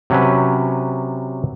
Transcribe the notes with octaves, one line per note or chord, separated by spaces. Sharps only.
C3 F#3 C#4 B4